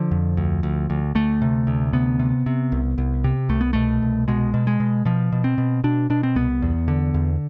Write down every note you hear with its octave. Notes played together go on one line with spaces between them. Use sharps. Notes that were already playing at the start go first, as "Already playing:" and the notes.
Already playing: D3 F3
F2
D2
D2
D2
D2 A3
C3
D2
C3 B3
C3
C3
C2
C2
C3
C2 A3
B3
B2 A3
C2
B2 G#3
B2
G#3
B2
B2 F3
B2
C4
B2
B2 D4
B2 D4
C4
C2 B3
E2
D3
E2